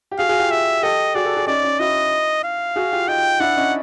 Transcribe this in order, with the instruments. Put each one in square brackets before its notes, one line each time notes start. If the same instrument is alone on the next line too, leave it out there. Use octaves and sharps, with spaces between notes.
[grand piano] G4
[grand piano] F#4 G#4 [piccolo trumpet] F5
[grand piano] F#4 G#4
F4 G4
[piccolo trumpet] E5
[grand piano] G4 A4 [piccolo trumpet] D#5
[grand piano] F#4 G#4 [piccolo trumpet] D5
[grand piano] G4 A4
F#4 G#4
[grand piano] C#4 D#4 [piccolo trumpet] D5
[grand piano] C#4 D#4
[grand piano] E4 F#4 [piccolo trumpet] D#5
[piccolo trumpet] F5
[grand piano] F#4 G#4
F4 G4
[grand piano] D#4 F4 [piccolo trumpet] G5
[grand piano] D4 E4 [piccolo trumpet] F#5
[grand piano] C#4 D#4